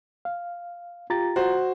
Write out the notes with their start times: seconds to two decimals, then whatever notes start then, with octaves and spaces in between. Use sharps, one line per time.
0.25 F5
1.10 F4 G4 A#5 A6
1.36 F#4 C5